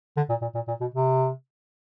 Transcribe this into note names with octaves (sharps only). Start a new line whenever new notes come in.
D3
A#2
A#2
A#2
A#2
B2
C3